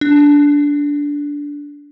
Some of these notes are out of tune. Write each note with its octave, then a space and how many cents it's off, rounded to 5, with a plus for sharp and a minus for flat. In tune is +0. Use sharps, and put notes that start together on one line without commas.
D4 -15